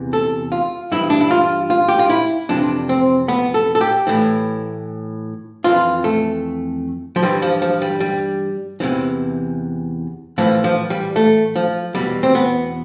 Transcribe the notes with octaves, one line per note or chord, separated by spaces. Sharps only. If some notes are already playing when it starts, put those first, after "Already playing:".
Already playing: E2 C3 E3
A4
F4
G2 E3 E4
D4
E4
F4
F4
G4
F4
E4
F2 C3 E3 D4
C4
B3
A4
A4
G4
A2 E3
F2 E3 F4
A3
F3
G2 E3 G3
F3
F3
G3
G3
E2 C3 E3
A2 E3 F3
F3
G3
A3
F3
E2 B2 G3
C4
B3